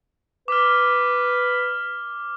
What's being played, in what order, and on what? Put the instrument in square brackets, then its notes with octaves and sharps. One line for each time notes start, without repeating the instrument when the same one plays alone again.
[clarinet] B4 [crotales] D6 F6